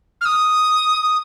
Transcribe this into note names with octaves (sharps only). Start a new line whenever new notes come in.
F6
D#6